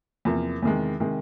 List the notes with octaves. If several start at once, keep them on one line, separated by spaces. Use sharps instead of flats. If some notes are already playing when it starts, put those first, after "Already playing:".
E2 C3 F3 A#3
E2 C3 D#3 G#3
C3 D#3 G#3